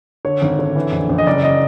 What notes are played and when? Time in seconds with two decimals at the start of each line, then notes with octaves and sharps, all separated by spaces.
0.25 D3 C#5
0.42 G#1
0.59 D3
0.76 E3
0.92 A#1
1.09 A#1
1.18 D#5
1.26 F#1 D5
1.44 D#5